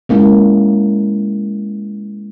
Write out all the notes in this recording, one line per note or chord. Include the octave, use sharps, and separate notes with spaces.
G#3 A#3 C#4 E4